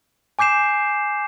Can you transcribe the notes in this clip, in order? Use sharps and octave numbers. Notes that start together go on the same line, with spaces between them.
G#5 D6 G6 C7 E7